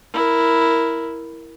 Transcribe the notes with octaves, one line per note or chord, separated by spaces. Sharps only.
E4 A#4